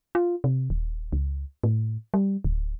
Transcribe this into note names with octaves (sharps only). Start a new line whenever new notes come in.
F4
C3
D#1
C#2
A2
G3
D1